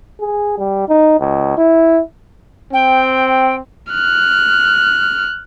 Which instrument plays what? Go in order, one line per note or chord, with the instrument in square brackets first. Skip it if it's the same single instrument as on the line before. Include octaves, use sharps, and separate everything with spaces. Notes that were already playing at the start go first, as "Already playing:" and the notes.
[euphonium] G#4
G3
D#4
C#2
E4
[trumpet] C4 [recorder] G5
[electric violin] F6 F#6